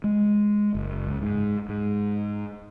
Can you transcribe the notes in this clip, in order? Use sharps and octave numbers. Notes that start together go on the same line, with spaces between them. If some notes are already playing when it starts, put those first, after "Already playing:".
G#3
F#1
C#2
G#2
G#2